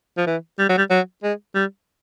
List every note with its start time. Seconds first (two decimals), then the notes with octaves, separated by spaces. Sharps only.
0.18 F3
0.27 E3
0.59 G3
0.69 F#3
0.78 G3
0.90 F#3
1.23 G#3
1.55 G3